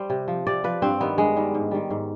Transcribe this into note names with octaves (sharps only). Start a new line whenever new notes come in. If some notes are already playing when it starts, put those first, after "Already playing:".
Already playing: G3 C5
C3
F3
C3 D5
F3 B4
G2 C4
D#3 G3 B3
G2 G#3
D#3 G3
G#2
D#3 G3
G#2